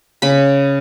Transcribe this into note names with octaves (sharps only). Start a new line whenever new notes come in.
C#3 B5